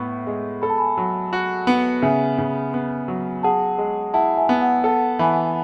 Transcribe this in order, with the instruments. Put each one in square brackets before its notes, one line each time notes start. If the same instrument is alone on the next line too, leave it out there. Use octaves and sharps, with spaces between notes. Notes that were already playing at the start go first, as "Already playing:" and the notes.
Already playing: [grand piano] A2 B3 [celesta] C#6
[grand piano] G#3
[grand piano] A4 [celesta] B5
[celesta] A5
G#5 B5
[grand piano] F#3
F#4
B3
[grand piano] C#3 [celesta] E5 G#5
[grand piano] C#3
B3
F#3
[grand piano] G#4 [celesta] F#5 A5
[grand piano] G#3
[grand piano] E4 [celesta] F#5 A5
[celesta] E5 G#5
[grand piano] B3
[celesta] F#5
[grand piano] A4 [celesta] F#5 A5
[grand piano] E3 [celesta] G#5 B5